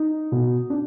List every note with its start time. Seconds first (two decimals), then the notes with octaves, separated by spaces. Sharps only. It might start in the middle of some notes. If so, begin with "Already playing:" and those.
Already playing: D#4
0.32 B2
0.70 D4